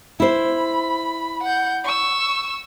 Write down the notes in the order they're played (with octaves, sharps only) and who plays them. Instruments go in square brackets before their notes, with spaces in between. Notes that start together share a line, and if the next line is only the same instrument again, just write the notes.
[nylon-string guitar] E4 C5 [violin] B5
[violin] F#5 G6
C#6 E6